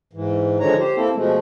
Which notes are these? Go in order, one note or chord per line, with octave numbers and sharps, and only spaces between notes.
G#2 E3
D3 D#3 F3 G#3 C#5 A#5
G4 C5
A#3 C4 E4 A4
B2 F3 G#3 A3